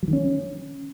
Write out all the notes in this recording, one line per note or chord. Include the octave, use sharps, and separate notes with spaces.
F#3
D#3
C#4